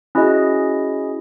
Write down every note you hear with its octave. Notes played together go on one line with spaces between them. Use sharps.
C#4 E4 F#4 G#4 D#5